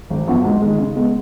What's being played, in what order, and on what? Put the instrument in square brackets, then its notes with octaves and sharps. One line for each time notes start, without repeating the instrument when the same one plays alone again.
[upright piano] G#1
F#2 F3 B3 F#4
G#2
D#3 G#3
C#3
G#3 B3